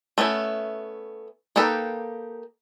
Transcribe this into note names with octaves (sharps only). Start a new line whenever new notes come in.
A3 B3 C#4 E4
A#3 D#4 G4 A4 B4